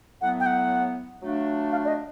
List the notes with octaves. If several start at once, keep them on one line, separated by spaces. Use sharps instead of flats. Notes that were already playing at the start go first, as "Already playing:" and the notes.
A2 F#3 B3 F#5
G5
F#5
F#3 A3 D4 F4
F5
D5
D#5